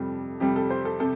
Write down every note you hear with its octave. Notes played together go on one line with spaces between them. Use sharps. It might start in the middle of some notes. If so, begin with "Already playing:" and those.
Already playing: F2 C3 G3 A4
F2 C3 G3 G4
A4
C5
A4
C3 A4